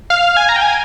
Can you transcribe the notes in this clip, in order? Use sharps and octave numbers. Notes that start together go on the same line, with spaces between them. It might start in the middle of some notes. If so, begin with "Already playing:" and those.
F5
G#5
A#5
G5
G#5